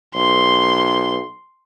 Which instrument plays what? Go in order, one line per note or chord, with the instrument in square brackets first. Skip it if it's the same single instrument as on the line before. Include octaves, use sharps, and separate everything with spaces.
[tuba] B1 [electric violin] C6